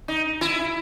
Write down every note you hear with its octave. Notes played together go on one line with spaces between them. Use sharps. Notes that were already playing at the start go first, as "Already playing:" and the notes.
D#4
E4